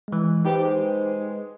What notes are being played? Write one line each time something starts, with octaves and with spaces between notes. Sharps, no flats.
E3 G#3
D#4 G4 B4 C5
G#3